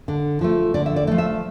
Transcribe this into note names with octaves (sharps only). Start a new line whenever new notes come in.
D3
F3 A3
D3 D5
E5
D5
F3 A3
E5